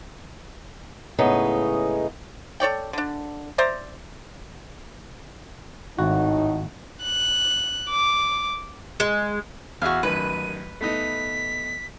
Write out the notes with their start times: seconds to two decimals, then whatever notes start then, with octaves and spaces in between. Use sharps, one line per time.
1.18 A2 C#3 G#3 B3 D#4
2.60 A4 C#5 D5 G5
2.93 D3 D4
3.58 C5 D5 E5 A#5
5.99 G#1 A2 D#4 F#4
7.03 F#6
7.90 D6
9.00 G#3
9.82 E2 F#4 E5 F5
10.03 A1 F#2 D#3 B4 D#7
10.81 A3 B3 D#4 B6